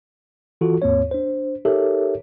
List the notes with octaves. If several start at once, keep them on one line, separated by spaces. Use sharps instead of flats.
E3 F4 F#4 A4
D#2 G#2 A#3 C4 C#5
D4 C5
D#4 G4 A4 A#4 C#5 E5